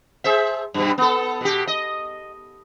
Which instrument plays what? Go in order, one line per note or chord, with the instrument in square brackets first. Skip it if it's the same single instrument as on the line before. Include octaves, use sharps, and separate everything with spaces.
[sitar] G#4 C5 E5
G2 B2 G3
B3 A4
B2 G4
D#5